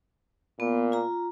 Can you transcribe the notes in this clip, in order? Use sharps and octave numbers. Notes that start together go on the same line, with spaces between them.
A#2 B3
F4 A#5